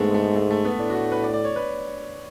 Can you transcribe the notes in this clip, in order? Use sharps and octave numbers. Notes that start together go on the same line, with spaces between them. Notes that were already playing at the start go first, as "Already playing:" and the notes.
Already playing: G#2 G#3 A3 B3
A3
A3
A3
B3
A2 D4
F#4
B4
D5
D5
C#5
B4